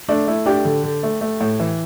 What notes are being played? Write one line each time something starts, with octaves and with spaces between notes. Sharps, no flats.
A3 D4
A3 E4
A3 D4 G4
D3
D3
A3
A3
A2
E3